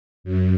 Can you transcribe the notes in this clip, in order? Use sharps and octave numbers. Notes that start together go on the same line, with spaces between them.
F#2